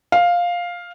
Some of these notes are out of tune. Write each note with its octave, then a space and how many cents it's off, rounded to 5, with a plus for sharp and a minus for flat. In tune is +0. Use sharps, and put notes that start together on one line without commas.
F5 +5